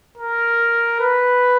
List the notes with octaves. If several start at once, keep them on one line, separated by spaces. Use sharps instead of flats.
A#4
B4